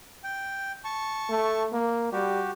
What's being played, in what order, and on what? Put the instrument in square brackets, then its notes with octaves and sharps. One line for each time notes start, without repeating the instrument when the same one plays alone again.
[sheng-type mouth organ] G5
A5 C#6
[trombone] A3
A#3
[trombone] G3 [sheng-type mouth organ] F#4 G4